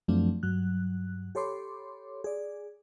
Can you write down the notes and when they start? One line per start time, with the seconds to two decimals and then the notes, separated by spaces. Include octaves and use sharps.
0.08 F#2 F3 F#3 A3 C4 D4
0.43 G2 F#3 F#6
1.35 G4 A4 C#5 B5 C6 D6
2.24 G#4 D5